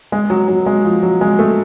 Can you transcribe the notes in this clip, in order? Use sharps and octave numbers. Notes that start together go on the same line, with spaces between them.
G#3
F#3
F#3
G#3
F3
F#3
G#3
A3